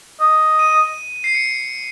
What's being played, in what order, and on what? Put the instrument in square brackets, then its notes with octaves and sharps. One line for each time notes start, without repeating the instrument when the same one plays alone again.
[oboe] D#5
[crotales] D#7
C7
C#7